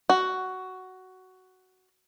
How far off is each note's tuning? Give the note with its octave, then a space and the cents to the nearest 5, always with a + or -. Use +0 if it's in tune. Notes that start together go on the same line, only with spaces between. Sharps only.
F#4 +10